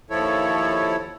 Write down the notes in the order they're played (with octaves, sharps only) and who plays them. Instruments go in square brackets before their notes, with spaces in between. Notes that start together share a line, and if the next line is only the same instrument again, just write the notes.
[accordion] D#2 F3 E4 A4 C#5